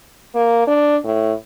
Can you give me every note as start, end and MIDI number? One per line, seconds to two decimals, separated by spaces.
0.35 0.66 58
0.67 0.97 62
1.04 1.33 45